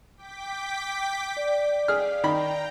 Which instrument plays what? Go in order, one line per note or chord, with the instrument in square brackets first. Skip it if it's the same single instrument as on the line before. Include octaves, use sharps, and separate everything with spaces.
[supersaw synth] G5 D6 B6
[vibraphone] D5
[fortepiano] G#4 F6 [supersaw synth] F5
[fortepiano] D#3 B5 [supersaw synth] G5 A#5